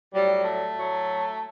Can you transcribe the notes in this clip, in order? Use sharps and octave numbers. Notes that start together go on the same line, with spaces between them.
A2 F#3 G3
A3
A2 F#3